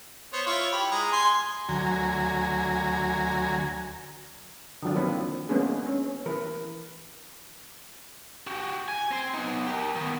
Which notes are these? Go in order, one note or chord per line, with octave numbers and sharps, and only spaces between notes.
B3 C5 C#5
E4 F4 C#5
G4 B5
G#3 A#5
G#5 C6
D2 F#3 G#5 A#5
D3 D#3 F3 F#3 D4
A#3 C4 D#4 B4
G#3 A#3 B3 C#4 D4 G#4
C#4
E3 A#4 B4
F#4 G4
G#5
C4 C6
B3 D#4
G4 A#4
D#3 B3